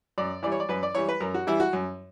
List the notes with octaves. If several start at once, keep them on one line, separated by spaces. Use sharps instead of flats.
F#2 D5
E3 G3 D5
C#5
D5
F#2 B4
D5
E3 G3 C#5
B4
F#2 A#4
F#4
E3 G3 E4
F#4
F#2